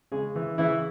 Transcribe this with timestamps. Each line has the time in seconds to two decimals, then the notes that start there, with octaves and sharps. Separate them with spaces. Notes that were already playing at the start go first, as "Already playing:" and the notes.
0.12 C#3 G#3 G#4
0.36 E3
0.58 C#3 E3 E4